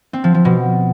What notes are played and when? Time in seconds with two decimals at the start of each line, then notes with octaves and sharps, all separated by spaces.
0.13 C4
0.24 F3
0.34 F3
0.45 B2